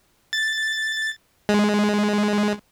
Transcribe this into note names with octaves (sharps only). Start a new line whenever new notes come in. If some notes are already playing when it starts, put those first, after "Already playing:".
A6
G#3